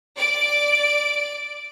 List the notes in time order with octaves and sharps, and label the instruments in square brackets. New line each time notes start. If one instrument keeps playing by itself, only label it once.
[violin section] D5 D7